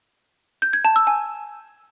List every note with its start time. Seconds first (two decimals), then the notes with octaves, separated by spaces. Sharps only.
0.62 G6
0.73 G#6
0.85 A5
0.96 E6
1.07 G#5